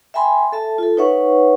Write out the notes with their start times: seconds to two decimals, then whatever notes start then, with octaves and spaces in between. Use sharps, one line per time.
0.14 E5 G5 G#5 B5 C6
0.52 A4 E5 A5
0.78 F4 A4
0.97 D#4 B4 C#5 E5 F#5 C#6